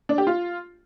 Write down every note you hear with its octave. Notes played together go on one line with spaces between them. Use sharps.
D4
G4
F4